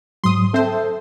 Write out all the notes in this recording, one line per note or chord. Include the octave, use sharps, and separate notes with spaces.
G#2 F#3 C6 D#6
C4 A4 C5 E5